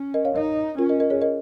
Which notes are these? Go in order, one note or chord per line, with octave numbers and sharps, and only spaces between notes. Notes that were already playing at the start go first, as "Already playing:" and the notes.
Already playing: C#4
A#4 D#5
C#5 F5
D#4 A#4 D#5
C#4 F4 A#4
A#4 D#5
A#4 D#5
G#4 C#5
A#4 D#5